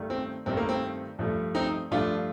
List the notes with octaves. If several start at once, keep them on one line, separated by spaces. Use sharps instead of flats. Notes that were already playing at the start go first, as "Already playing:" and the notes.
Already playing: G2 D#3 A3
C4
G2 D#3 A3 C4
A#3
C4
G2 F3 A3
C4 D#4
G2 F3 A3 D4 F4